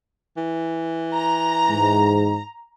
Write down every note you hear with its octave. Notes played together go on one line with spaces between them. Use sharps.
E3
A#5
G#2